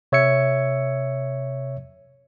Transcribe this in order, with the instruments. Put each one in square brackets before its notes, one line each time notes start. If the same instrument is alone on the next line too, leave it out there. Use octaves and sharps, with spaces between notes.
[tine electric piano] C3 C#5 E5 E6 G#6 C#7